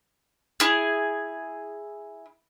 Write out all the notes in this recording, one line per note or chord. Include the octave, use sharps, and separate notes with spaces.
E4 G#4